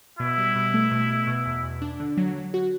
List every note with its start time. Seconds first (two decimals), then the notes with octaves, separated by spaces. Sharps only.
0.19 B2 E4
0.38 G3
0.55 B2
0.74 A3
0.91 B2
1.10 B2
1.27 B2
1.46 E2
1.64 E2
1.82 D4
2.00 D3
2.17 F#3
2.36 F#3
2.54 F#4